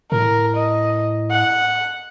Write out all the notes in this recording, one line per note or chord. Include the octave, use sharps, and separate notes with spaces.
A2 A#4
D#5
F#5